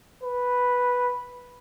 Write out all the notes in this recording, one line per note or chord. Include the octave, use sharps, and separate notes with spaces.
B4